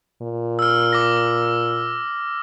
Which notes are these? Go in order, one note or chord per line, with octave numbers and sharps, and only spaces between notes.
A#2
E6 F6
D6 A#6